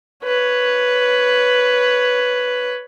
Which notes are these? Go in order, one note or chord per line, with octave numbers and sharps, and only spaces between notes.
B4 C#5